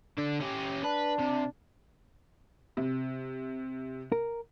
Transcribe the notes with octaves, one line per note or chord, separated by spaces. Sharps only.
D3 D4
C#4 G4
D4 B4
C3
C3
A#4